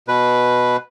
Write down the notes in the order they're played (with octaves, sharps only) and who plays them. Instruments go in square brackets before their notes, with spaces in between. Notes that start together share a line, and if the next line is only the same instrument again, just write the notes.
[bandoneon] B2 B4